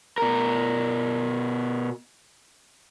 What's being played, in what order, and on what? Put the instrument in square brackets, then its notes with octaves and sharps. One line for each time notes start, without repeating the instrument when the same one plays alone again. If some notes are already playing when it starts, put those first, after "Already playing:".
[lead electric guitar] B2 A#4